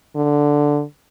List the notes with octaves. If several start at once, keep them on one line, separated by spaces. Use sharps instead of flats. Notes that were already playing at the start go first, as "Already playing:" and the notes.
D3